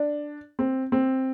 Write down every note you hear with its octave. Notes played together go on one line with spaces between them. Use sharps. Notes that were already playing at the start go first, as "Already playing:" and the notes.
Already playing: D4
C4
C4